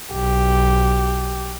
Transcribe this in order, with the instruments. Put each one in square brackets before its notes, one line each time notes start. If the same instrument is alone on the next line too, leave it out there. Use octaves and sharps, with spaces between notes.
[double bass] B1 [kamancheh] G4